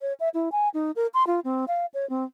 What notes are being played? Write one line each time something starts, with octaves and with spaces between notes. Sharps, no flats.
C#5
E5
E4
G#5
D#4
A#4
C6
F4
C4
F5
C#5
C4